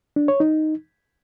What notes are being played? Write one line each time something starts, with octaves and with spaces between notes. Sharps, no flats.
D4
C#5
D#4